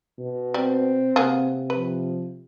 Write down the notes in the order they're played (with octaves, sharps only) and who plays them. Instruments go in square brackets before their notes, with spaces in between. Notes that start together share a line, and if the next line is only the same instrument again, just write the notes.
[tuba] B2
[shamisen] G3 [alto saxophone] C4
[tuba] C3 [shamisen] A#3 B3 G#4
[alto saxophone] F3 [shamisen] B4